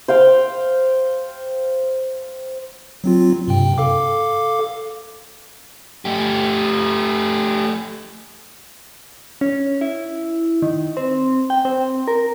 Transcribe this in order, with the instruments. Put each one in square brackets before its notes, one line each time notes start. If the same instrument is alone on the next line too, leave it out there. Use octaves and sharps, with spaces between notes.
[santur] C5 F5 G5
[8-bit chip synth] F#3 C4 F4
G2 C3 G5
A4 F5 D6
[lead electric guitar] A3 G4
[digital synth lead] C#4
E4
D#3
C4
G5
C4
A#4